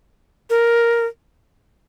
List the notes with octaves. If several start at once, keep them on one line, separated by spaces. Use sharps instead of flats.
A#4